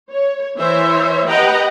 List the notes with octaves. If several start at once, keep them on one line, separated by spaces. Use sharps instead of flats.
C#5
E3 C5 C#5 E5
G4 B4 D#5 F#5 G5 A#5